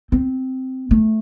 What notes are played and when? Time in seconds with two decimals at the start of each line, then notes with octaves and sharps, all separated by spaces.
0.12 C4
0.91 A3